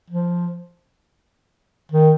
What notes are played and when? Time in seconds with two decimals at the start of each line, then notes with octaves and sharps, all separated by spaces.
0.10 F3
1.92 D#3